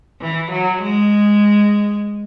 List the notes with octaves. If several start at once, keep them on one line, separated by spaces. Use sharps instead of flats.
E3
F#3
G#3